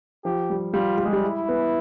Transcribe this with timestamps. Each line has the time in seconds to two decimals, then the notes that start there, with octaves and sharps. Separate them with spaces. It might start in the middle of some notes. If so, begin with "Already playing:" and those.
0.25 F3 G4
0.50 G3
0.74 G3 F4
0.98 G3
1.05 G#3
1.13 G3
1.23 E4
1.49 B3